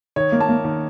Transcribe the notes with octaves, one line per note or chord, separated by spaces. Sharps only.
D#3 C#5
A#3
A5
A#3
D#3